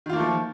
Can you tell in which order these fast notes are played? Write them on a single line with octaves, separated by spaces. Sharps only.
D#3 F4 A#3 A3 F3